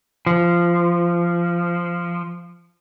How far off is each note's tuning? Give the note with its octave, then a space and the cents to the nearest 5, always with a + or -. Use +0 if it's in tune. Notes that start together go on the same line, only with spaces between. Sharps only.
F3 -15